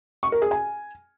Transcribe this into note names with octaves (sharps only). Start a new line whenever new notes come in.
C#6
A#4
G#4
G#5